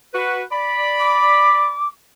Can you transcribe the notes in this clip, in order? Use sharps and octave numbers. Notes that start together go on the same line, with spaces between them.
F#4 B4
D5 B5
D6